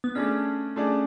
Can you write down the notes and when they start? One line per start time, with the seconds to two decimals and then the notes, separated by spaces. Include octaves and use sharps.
0.04 B3
0.15 A3 C#4 D4 G#4 D5
0.76 A3 D4 G#4 D5